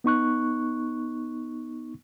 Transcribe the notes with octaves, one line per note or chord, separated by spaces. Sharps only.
B3 D#4 C#6 F#6